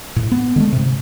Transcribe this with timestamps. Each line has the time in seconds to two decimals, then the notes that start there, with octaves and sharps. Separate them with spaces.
0.16 A2
0.31 B3
0.56 D3 G#3 A3
0.73 G#2 C3